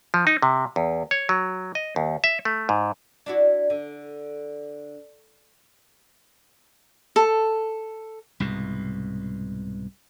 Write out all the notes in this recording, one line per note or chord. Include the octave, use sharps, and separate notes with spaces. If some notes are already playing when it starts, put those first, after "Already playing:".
F3
D#4
C3
E2
C#5
F#3
D#5
D#2
E5
A3
G#2
D4 E4 F#4
D3
A4
C2 G#2 B2